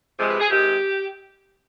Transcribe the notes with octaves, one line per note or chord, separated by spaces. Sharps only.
C3 F3 G#3
B4
G#4
C3 D#3 G#3 G4